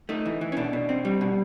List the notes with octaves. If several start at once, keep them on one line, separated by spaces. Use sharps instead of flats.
A3 D#4
E3
E3
C#4
B2 D4
B2
C4
G3
B2